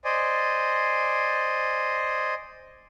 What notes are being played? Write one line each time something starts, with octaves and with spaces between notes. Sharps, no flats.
C5 D5 D#5 G#5